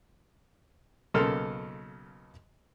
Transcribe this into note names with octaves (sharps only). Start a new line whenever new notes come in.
B1 C#3 A#3 A4 C6 F6